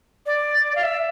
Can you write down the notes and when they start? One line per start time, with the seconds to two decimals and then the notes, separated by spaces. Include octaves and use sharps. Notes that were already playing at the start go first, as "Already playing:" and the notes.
0.26 D5
0.75 F5
0.83 E5